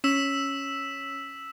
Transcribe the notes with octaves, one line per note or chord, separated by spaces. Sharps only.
C#4 E6 B6 E7